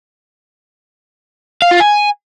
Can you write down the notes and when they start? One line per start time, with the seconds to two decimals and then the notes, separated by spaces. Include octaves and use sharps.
1.62 F5
1.71 F4
1.81 G#5